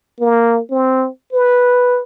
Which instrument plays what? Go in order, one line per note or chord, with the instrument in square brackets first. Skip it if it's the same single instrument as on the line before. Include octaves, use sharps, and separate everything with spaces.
[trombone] A#3
C4
B4